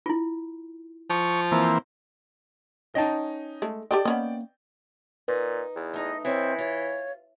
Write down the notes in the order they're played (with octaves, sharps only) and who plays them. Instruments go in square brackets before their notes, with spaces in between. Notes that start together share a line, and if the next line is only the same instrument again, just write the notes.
[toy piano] E4 F4
[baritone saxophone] F3 [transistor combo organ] C#6
[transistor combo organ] E3 A#3 C4
[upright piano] C#4 D#4 [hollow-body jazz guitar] D#5 G5 A5
[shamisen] G#3 A3
[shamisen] G4 A4 D#5 [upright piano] D5 G5
[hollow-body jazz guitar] A#3 [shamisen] B3 C#4 D#5
[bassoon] A#2 [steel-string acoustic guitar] D#4 [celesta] B4
[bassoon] E2
[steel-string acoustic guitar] A3 D#4 [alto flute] D#5
[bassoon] E3 [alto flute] C4 [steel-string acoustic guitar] E4 C#5 D#5
[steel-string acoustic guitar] F4 [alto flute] C#5